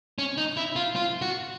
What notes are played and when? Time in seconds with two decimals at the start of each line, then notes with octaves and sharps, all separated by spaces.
0.19 C#4
0.38 D#4
0.57 E4
0.76 F4
0.96 F4
1.22 F#4